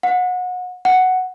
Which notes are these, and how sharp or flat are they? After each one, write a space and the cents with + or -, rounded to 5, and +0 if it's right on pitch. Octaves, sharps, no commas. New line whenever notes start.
F#5 -30
F#5 +0